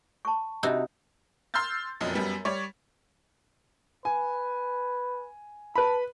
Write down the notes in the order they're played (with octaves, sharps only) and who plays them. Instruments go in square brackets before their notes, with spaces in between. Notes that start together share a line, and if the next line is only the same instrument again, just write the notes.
[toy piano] A5 C#6
[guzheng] C3 D#4 F#4 [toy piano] D4 B5 E6
[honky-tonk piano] C6 E6 F6 G6 A6
F1 F#2 A#2 D#5
F#2 G3 B3
G3 C#5 D5
[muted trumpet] B4 [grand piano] G#5
[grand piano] B4 B5 [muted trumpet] A5